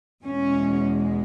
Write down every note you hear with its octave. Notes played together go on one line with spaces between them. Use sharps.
E2 B2 G#3 C#4